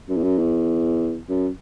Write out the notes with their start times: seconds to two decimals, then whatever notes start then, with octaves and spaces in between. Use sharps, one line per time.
0.09 F#2
0.17 E2
0.23 F#2
0.38 E2
1.29 F#2